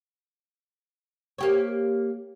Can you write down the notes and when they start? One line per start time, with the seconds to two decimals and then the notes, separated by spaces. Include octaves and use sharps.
1.38 A#3 G4 C#5